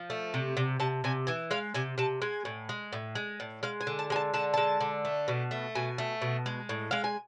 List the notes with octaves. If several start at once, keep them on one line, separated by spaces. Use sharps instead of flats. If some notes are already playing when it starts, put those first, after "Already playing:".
Already playing: F3
A3
C3
C3
C3 A5
C3 G#5
E3 G#5
G#3 F5
C3 G#5
C3 A5
G#3 G#5
A2
G#3
A2
G#3
A2
G#3 F5
G#5
D3
A5
G#3 G#5
A5
D3 A5
G#3 A5
D3
A3
B2
A3
B2 G#5
A3
B2
G#3
A2
G#3 F5
G#5